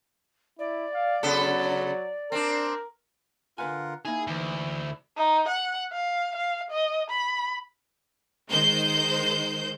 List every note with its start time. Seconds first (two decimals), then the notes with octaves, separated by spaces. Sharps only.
0.59 E4 D5
0.94 F5
1.23 C#3 F#3 B3 A4
2.32 C4 D4 A#4
3.58 D3 F4 A#4 B4 F#5 G#5
4.05 A#3 D#4 E4 G#4
4.27 D2 E3
5.16 D#4
5.48 F#5
5.92 F5
6.35 F5
6.70 D#5
7.10 B5
8.50 D#3 G#3 A#4 C5 G6